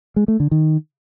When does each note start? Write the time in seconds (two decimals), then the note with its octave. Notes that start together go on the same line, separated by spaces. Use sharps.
0.16 G#3
0.28 A3
0.40 D3
0.51 D#3